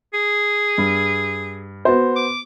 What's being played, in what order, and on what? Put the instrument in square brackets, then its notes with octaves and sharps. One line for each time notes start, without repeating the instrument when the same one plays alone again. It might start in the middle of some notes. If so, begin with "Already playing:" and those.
[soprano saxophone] G#4
[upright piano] G2
B3 F#4 C5
[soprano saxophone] D6